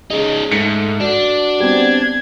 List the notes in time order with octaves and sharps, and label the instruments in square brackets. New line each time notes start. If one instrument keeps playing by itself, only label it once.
[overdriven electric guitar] C#4 D#4 [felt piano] G#4
[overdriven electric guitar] G#2 [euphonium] A3 [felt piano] C#7
[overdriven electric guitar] D4 [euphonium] F#4
[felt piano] G3 B3 C4 [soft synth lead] G#6